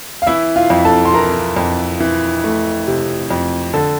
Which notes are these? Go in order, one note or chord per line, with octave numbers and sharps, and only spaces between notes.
F5
E3 E4 E5
F4 F5
F2
A4 A5
C6
E3 A#4 A#5
F2
E3
A3
C3
F2
D3 A4 A5